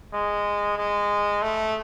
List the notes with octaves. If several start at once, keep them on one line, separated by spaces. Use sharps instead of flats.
G#3
G#3
A3